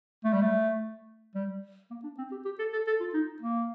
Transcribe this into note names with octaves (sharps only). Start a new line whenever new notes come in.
A3
G3
A3
G3
A#3
D4
C4
G4
G4
A4
A4
A4
F4
D#4
A#3